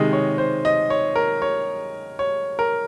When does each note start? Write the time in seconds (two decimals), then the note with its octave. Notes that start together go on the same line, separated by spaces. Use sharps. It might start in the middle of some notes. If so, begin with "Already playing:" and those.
Already playing: C3 D#3 G#3 D#5
0.13 C#5
0.38 C5
0.65 D#5
0.90 C#5
1.16 A#4
1.42 C#5
2.19 C#5
2.59 A#4